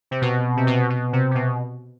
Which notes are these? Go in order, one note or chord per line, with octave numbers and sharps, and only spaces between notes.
C3
B2
C3
B2
B2
C3
C3
B2